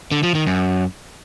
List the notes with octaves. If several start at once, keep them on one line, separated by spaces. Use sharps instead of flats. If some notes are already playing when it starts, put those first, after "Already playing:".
D3
F3
D#3
F#2